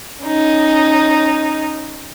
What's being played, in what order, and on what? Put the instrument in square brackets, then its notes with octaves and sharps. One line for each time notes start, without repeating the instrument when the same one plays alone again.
[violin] C#4 D#4